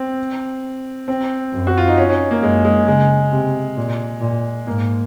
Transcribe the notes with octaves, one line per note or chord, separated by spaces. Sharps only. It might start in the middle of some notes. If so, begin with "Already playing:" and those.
Already playing: C4
C4
F#2
F#4
F4
D#4
C#4
D#4
C#4
A#3
F#2 G#3
G#3
C#3 G#3
C3
A#2
A#2
G#2 A#3